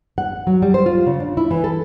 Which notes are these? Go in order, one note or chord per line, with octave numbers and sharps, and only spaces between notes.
F#5
F#3
G3
C5
F4
C#3
D4
E4
E3
A4